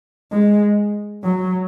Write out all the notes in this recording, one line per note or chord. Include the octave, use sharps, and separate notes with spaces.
G#3
F#3